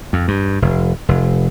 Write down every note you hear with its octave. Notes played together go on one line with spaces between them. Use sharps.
F2
G2
F1
F1